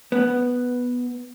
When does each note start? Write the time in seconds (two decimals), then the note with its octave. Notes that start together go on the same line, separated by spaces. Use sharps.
0.12 B3